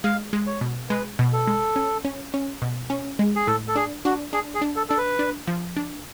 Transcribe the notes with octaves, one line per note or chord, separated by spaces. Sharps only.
G#3 F5
G#3
C#5
B2
G#3 B4
B2
A4
G#3
C#4
C#4
C#4
B2
C#4
G#3
G#4
A2 A4
A4
D4 G#4
D4 F#4
D4 G#4
G#4
D4
A4
D4 A4
B4
D4
F3
D4